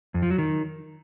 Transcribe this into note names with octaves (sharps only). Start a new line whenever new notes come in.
F2
F3
F#3
D#3